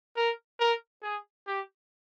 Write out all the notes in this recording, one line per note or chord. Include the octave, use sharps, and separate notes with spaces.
A#4
A#4
G#4
G4